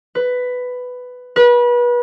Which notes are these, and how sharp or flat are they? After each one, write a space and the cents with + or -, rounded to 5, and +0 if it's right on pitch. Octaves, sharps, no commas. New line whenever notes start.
B4 +10
B4 -30